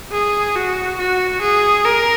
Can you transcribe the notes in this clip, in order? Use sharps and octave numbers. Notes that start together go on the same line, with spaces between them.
G#4
F#4
F#4
G#4
A#4